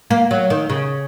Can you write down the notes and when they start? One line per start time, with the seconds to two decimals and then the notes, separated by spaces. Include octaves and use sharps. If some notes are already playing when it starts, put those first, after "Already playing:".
0.10 A#3
0.31 F#3
0.50 D#3
0.69 C#3